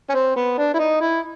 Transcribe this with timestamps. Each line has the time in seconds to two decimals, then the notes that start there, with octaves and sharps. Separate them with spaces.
0.10 C#4
0.14 C4
0.36 B3
0.58 D4
0.74 E4
0.79 D#4
1.01 E4